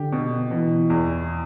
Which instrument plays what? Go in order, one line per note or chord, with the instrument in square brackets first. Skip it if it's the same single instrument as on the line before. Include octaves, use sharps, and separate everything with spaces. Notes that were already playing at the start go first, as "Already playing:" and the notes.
Already playing: [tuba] D3 [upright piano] G4
[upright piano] B2
[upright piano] B2 [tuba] E3
[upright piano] E2